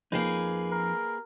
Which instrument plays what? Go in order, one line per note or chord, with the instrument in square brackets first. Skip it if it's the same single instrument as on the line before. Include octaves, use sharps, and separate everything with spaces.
[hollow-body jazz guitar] F2 D#4 [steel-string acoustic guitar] A#3 G#4 B4
[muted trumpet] A#4